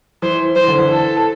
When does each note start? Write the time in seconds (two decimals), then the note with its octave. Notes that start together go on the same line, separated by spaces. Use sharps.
0.22 E3 C5
0.56 E3 C5
0.68 D3
0.79 E3
0.89 A4